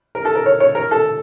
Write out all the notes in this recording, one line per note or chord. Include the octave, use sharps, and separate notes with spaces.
A#4
A4
A#4
C#5
C#5
A#4
A4